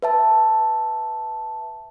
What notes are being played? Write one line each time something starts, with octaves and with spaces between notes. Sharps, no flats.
B4 E5 A5